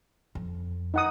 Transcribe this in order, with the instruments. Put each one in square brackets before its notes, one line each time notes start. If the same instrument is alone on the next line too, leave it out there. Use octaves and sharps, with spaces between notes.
[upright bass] F2
[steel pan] D#4 F#5 D#6